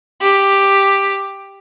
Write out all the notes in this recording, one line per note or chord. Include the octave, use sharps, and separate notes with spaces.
G4